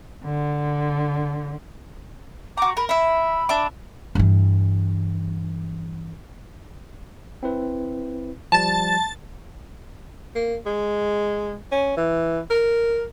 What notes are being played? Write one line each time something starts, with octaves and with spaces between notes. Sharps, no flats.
D3
F#4 A#5 D6
A#4 B5
E4 E5 B5
D4 E5 D6
G2 E3
C4 E4 B4
F3 G3 A5 A6
A#3
G#3
C#4
E3
A#4